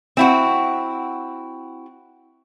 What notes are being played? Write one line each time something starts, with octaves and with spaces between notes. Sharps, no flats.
C4 E4 F#4